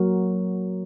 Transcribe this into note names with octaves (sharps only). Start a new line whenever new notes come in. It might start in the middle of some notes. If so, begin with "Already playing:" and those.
Already playing: F#3 A#3 F#4 A#4